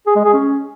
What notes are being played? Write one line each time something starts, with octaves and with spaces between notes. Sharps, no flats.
G#4
G#3
G#4
C#4